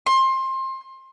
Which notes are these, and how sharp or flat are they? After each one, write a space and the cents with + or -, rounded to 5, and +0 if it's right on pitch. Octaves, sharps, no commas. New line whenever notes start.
C6 +25